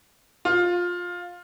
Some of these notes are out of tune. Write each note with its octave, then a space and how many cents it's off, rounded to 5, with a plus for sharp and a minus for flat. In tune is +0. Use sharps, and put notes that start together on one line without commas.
F4 +15